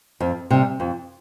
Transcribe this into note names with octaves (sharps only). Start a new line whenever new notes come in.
F2
C3 G3
F2